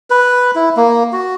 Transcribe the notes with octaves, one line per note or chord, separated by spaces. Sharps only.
B4
E4
A#3
F#4